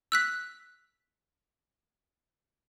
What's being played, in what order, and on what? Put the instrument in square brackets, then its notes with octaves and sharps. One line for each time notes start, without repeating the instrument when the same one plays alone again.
[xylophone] E6 F#6 B6